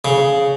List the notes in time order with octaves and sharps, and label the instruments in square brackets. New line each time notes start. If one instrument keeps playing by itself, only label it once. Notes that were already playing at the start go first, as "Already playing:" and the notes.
[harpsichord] C#3